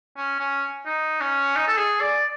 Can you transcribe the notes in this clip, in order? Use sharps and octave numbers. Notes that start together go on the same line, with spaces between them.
C#4
C#4
D#4
C#4
D#4
A4
G#4
D5